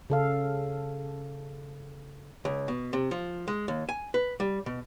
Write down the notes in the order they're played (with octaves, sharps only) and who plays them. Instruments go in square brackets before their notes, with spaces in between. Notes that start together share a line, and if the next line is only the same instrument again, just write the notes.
[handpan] C#3 A4 F5
[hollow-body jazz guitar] C#2
B2
C3
F3
G#3
D#2
G#5
B4
G3
B2